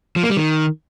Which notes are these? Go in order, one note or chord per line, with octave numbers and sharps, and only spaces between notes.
F3
A#3
G3
D#3